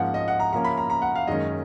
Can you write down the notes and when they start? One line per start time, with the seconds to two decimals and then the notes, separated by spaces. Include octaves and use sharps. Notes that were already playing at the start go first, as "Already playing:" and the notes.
Already playing: G#2 F3 A#3 C#4 F#5
0.14 D#5
0.28 F#5
0.40 A#5
0.52 C#3 F3 A#3 C#4 A#5
0.65 B5
0.77 A#5
0.90 A#5
1.02 F#5
1.15 F5
1.27 F#2 D#3 G#3 C#4 D#5